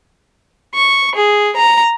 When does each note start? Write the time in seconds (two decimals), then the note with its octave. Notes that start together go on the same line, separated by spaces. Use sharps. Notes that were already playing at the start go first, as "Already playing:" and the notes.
0.75 C#6
1.16 G#4
1.57 A#5